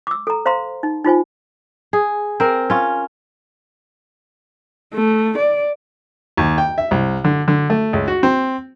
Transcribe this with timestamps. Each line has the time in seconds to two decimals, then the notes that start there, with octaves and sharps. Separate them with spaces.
0.07 D6 E6
0.27 A4 A#5
0.46 C5 F5 A#5 C6
0.83 D#4
1.04 D#4 F4 C5 G#5
1.93 G#4
2.40 C4 A#4
2.70 C#4 F4
4.94 A3
5.38 D5
6.37 D#2
6.58 G5
6.78 E5
6.91 C2
7.24 D3
7.48 D3
7.70 A3
7.93 C#2
8.08 F#4
8.23 C4